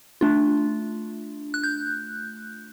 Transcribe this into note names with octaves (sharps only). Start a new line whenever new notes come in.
A3 D4 F4
F#6
G6